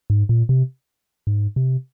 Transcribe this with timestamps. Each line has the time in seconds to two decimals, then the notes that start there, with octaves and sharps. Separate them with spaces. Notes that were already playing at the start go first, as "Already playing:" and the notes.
0.10 G#2
0.29 A#2
0.49 C3
1.27 G#2
1.56 C3